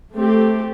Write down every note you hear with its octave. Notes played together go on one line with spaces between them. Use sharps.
A3 C4 G4